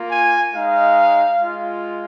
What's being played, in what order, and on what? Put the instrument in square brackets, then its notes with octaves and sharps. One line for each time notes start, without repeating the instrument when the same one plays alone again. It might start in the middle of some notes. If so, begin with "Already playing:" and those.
Already playing: [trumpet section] A#3 F4
G#5
G#3 D#4 F5
G#3 F4